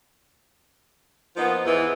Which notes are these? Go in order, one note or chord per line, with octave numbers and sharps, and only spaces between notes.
F3 A#3 B3 D#4
E2 G#2 E3